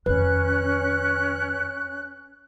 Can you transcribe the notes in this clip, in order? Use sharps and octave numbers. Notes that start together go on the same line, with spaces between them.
F2 D#3 C#4 B4 F#6